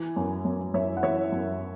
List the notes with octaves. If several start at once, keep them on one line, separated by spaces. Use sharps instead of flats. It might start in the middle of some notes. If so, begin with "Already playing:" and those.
Already playing: E3 G#5
F#2
F#2
F#2 C#5 E5
F#5
E3 C#5 E5
F#2